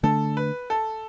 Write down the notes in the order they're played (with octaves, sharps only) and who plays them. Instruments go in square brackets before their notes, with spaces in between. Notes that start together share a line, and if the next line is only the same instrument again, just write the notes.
[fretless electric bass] D3 A3 D4 [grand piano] A4
[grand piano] B4
A4